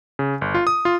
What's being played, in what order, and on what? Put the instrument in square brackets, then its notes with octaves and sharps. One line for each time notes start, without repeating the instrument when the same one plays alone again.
[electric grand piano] C#3
G1
F4
D#6
F4